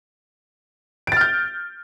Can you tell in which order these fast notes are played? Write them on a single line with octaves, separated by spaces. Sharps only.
D7 A6 F6 G6